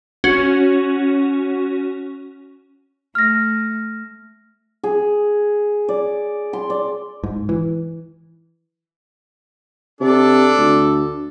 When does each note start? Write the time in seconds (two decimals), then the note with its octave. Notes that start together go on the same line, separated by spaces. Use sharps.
0.24 C#4 F#4
3.15 A3 F6 A#6
4.84 G#4
5.89 D5
6.53 C6
6.70 D5
7.23 G#2
7.49 E3
10.01 C3 D4 A4
10.57 D2